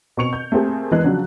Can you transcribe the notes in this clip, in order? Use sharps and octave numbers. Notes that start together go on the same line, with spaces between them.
B2 C4 C#6 C#7 F7
G6
A3 A#3 C4 G4 G#4
E2 E3 G#3 F#6
C#3 F3 F#3 D4